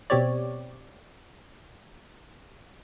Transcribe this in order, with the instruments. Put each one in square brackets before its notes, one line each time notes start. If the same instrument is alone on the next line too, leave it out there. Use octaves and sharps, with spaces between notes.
[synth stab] B2 C4 G4 C#5 D5